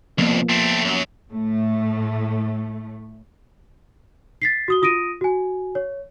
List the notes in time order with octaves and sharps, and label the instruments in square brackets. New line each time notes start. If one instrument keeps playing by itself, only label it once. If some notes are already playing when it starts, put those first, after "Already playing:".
[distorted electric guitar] C2 F2 [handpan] F3 A#3 B3
[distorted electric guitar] A3 C4
F#2 F#3
[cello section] A2 A3
[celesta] A6 B6 C7
F#4 D#6 G7
F4 D#6 A#6 D7 D#7
F#4 G#5
C#5